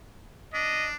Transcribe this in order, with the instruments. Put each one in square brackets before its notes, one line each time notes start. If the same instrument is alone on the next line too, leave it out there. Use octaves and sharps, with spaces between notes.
[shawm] D4 [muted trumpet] D#5